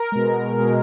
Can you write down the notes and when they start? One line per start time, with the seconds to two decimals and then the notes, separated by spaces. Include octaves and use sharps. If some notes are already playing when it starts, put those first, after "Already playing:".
Already playing: A#4
0.12 B2 G#3
0.59 B2 G#3